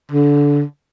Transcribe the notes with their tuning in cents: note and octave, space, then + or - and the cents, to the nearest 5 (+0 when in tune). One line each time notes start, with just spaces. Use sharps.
D3 -20